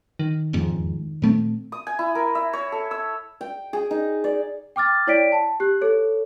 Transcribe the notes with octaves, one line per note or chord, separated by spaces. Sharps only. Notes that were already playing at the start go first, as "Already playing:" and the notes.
D#3
E1 F2 G#2
A#2 A3 C4
D#6
G#5
E4
A#4
E5
C#5
A4
E6
G5
G#4
D#4
D5
G5 D6 F6 A6
E4 C#5 D5 G5 B6 D7
A5
G4 F#6
A4 C#5